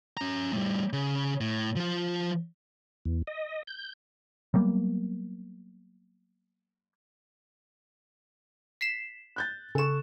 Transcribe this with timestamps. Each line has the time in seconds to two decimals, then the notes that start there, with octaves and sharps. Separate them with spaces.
0.17 C#4 A#5
0.53 A2 G3
0.93 C#3
1.41 A2
1.76 F3 F4
3.05 E2
3.27 D#5
3.67 G6
4.54 F#3 G3 A#3 B3
8.81 B6 C7 E7
9.36 F#6 G6 A6
9.75 C#3 A4 C#6 E7